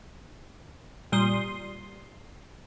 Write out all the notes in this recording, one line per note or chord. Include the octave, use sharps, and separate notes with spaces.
A#2 G3 C6 D#6